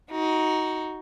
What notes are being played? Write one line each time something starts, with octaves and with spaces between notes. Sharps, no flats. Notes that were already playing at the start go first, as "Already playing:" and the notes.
D#4 F#4